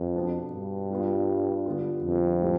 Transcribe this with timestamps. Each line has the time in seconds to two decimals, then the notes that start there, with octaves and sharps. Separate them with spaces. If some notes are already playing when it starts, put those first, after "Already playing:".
Already playing: F2
0.15 B2 B3 D4
0.53 G2
0.90 G3 B3 F4
1.66 D3 G3 B3 F4
2.04 F2
2.42 A2 G3